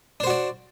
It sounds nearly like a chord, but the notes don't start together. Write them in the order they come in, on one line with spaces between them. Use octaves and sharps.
D4 C5 F#4 D5